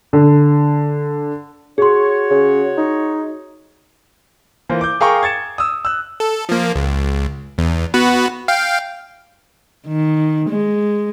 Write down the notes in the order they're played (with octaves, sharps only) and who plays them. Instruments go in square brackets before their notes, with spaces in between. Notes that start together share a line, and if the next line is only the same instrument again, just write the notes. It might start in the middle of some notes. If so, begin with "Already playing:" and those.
[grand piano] D3
[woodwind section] F#4 C#5 [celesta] G#4 C6
[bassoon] C#3
D#4
[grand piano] E3 A#3 F4 C5
D6 G6
G#4 A#4 F5 G5 A#5 C#6
G#6 A6 C#7 E7
D#6 E6
E6 F#6
[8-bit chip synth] A4
F3 A#3
C#2
E2
B3 F#4 B4
F5 G5
[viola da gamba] D#3
G#3